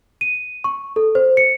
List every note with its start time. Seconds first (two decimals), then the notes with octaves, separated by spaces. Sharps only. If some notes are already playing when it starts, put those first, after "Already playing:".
0.21 D#7
0.64 C#6
0.96 A4
1.15 C5
1.37 C#7